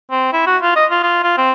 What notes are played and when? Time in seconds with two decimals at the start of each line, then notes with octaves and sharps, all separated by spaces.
0.11 C4
0.33 E4
0.46 F#4
0.62 F4
0.76 D#5
0.91 F4
1.03 F4
1.23 F4
1.37 C4